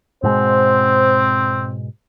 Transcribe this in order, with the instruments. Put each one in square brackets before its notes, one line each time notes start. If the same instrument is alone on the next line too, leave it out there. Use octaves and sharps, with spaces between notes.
[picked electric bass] G#2 B2 G#3 [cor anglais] C4 [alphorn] C5